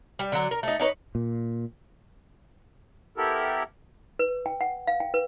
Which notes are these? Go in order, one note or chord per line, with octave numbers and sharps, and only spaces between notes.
G3
D3 F#3
A#4
A3 D#4
D4 D#4 B4 C#5
A#2
B3 E4 G4 A4 A#4
B4
G5
F#5
F5
G5
B4